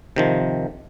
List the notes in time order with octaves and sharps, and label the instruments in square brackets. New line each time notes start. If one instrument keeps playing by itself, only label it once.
[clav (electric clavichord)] C3 D#3 F3